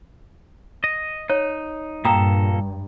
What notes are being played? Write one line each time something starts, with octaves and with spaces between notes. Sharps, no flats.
D#5
D#4 C#5
G2 A#2 A#3 A4 G5 A#5 D#6